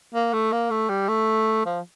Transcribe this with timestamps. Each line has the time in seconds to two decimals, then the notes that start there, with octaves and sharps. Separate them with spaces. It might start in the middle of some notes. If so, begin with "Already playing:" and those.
0.14 A#3
0.33 A3
0.52 A#3
0.70 A3
0.89 G3
1.08 A3
1.66 F3